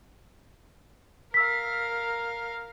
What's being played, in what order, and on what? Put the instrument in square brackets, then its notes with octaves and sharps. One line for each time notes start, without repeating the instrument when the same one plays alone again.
[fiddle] A#4 F5 [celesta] E6 B6